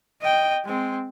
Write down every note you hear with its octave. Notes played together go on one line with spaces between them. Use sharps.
D#5 G5
G#3 C4